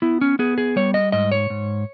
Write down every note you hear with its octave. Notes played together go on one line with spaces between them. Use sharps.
B3 E4
C#4
B3 G#4
G#4
G3 C#5
D#5
G#2 D#5
C#5
G#2